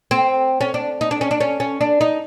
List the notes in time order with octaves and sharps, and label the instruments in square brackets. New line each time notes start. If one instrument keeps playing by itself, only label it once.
[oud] C4
C#4
D4
D#4
D4
C#4
D4
C#4
C#4
D4
D#4